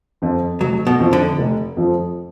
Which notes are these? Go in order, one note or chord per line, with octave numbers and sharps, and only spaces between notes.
F2 F3
F1 F#3
B2
F2 F3
D3
F1
F2 F3